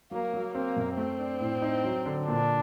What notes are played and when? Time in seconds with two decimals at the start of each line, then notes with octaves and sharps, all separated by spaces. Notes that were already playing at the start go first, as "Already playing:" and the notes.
0.11 F#3 A#3
0.34 F#3
0.54 A#3 C4
0.76 F#2
0.97 A3 C4
1.19 D4
1.40 A2
1.62 D#4
1.85 F#3
2.06 D3
2.27 A#2 D4